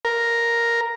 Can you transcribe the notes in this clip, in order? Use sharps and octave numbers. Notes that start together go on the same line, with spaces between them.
A#4